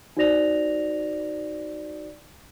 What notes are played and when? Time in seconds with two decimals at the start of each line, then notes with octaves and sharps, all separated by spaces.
0.17 D#4 F#4 C5 D5 A#6 F7